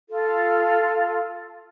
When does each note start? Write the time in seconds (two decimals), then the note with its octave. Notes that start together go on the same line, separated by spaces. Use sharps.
0.08 F4 A4